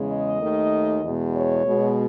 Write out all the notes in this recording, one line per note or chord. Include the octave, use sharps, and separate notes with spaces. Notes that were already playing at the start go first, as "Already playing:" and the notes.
Already playing: E2 C#3 G#3
D#5
D#2 D#3 A3
E2 B2 G#3
C#5
B2 G#3